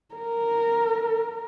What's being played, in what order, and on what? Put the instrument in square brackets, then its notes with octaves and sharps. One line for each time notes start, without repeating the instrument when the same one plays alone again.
[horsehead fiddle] A#4